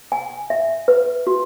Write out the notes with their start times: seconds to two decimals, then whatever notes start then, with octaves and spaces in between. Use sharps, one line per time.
0.12 G#5
0.50 E5
0.88 B4
1.27 F#4